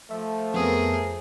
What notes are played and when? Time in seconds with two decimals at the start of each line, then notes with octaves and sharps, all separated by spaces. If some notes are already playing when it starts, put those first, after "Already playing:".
0.11 F3 A3 E5
0.54 F2 B3 G#4 A#4 D#6